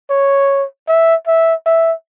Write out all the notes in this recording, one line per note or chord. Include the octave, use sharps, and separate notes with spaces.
C#5
E5
E5
E5